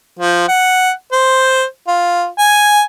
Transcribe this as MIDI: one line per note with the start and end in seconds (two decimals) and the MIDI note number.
0.19 0.44 53
0.48 0.90 78
1.12 1.63 72
1.88 2.25 65
2.39 2.82 80